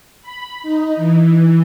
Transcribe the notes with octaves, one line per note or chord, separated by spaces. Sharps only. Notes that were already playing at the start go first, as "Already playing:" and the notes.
B5
D#4
E3